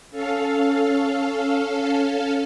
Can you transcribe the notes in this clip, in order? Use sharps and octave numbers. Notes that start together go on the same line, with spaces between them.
C#4 A4 F5